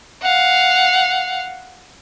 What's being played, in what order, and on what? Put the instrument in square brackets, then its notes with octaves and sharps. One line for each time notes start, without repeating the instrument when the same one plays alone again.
[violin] F5 F#5